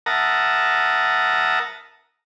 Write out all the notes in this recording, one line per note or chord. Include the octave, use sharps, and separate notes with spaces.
A#4 E5 F#5 A5 A#5 D#6